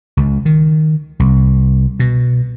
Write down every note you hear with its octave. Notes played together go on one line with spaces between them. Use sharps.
C#2
D#3
C2
B2